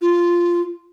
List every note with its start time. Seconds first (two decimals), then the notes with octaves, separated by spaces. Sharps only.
0.02 F4